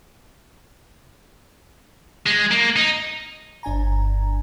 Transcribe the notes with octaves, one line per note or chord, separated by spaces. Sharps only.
G#3
A#3
D#4
G1 D4 G#5 A#5